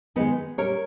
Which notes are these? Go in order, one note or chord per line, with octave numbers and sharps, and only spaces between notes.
G#2 D#3 G#3 B3 D#4
A#2 G3 A#4 C#5